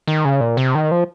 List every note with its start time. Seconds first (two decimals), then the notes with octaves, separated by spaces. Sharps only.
0.07 D#3
0.25 C#3
0.41 A#2
0.57 C3
0.75 D#3
0.91 F3